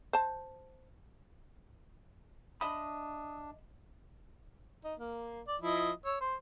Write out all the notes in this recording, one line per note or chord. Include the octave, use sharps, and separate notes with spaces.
C5 A5
D4 D#5 E5 B5 D#6
D#4
A#3
D5
F3 E4 D#5
C#5 E6
C5